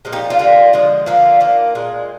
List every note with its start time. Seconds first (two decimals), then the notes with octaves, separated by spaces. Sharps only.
0.05 A#2 F3 G#3
0.12 D#4 G4
0.30 D4 F4
0.39 D3 G3 A#3
0.73 D3 F3 G#3
1.06 D3 F3 A#3 D4 F4
1.40 D#3 A#3
1.75 A#2 G#3